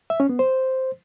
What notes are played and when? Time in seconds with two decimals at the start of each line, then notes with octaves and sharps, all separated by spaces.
0.10 E5
0.20 C#4
0.29 B3
0.39 C5